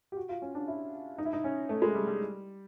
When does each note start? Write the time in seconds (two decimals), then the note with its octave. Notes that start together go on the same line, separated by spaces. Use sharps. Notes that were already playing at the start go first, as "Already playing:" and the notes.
0.12 G4
0.17 F#4
0.29 F4
0.42 C#4
0.55 D4
0.68 E4
1.18 D#4
1.25 E4
1.33 D#4
1.44 C#4
1.69 A3
1.82 G#3
1.95 G3
2.07 G3